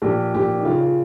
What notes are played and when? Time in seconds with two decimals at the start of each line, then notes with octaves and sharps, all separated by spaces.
0.02 A#1 G4
0.34 A#1 G4
0.59 D#4
0.65 C#3 F4
0.81 F4